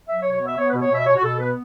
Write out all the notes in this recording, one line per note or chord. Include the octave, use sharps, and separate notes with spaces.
F#3 E5
C#5
B2
C#5
B3 E5
B3 C#5
B4
B2
C#5
B2 E5
B2 C#5
F#4
B2 A4
B3 B4